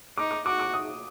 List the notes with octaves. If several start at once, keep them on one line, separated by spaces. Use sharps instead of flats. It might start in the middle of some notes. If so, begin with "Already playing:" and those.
D#4 D6
D6
F#4 D6
D6
D#6